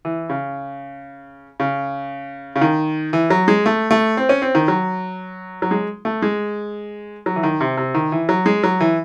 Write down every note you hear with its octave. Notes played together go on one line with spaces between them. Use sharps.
E3
C#3
C#3
C#3
D#3
E3
F#3
G#3
A3
A3
C4
C#4
C4
D#3
F#3
F#3
G#3
A3
G#3
F#3
E3
D#3
C3
C3
D#3
E3
F#3
G#3
F#3
E3